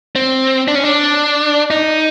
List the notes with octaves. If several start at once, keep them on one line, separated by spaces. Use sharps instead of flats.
C4
D4
C#4
D4
D#4